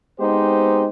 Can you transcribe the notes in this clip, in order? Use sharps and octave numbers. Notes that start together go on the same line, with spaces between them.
G#3 B3 C4 D#4 G4 C5